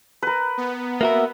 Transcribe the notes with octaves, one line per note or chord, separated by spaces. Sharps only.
A#4 B4
B3
A#3 F#4 A#4 E5